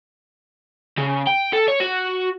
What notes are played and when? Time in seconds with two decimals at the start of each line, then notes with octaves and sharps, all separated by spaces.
0.98 C#3
1.27 G5
1.53 A4
1.68 C#5
1.80 F#4